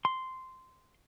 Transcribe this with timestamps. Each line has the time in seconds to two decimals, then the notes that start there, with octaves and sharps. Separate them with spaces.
0.05 C6